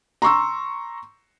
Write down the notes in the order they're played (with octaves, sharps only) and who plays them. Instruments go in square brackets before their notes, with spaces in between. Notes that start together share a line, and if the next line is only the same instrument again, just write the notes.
[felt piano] A#5 C6 C#6 E6